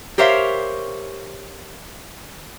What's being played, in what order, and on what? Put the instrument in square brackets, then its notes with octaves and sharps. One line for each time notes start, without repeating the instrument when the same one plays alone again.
[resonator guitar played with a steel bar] G4 A#4 C5 C#5 E5 F5